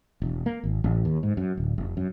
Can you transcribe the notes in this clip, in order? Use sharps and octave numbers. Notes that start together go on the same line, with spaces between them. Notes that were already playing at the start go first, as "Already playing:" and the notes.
E1
A#3
G#1
A1
D#2
G#2
F#2
D1
F1
F#2